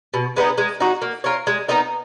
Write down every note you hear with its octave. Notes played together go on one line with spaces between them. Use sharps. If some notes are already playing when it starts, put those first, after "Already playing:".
B2
G#3 B3 D#4
G#3
D#4 F#4
A#3
F4 A#4 C#5
G#3
B3 D#4 A#4